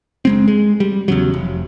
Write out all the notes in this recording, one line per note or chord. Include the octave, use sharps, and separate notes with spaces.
F#1 G#3 C4
G#3
G3
E2 C#3 F#3
F1